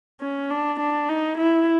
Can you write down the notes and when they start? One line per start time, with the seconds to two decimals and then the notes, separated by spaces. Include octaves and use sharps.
0.21 C#4
0.50 D4
0.79 D4
1.09 D#4
1.38 E4